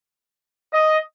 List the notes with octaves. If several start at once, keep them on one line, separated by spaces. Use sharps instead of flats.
D#5